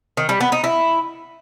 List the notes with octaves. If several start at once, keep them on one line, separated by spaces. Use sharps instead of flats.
D#3
G3
B3
D#4
E4